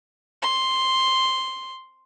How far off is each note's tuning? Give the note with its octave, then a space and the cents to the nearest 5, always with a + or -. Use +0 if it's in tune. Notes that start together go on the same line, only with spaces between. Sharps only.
C6 +0